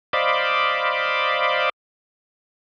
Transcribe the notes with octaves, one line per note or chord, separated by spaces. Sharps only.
C5 D5 D#5 F5 B5 D6